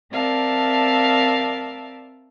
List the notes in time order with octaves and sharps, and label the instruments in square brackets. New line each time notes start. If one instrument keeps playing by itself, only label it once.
[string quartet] C4 A#4 D5 E5 F5 A5